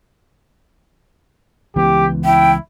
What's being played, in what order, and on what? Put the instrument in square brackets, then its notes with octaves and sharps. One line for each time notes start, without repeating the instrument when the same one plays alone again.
[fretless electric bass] C#2 E3 B3 [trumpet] G4
[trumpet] E4 [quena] G5